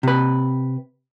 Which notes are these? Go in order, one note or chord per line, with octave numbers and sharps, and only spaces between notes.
C3 B4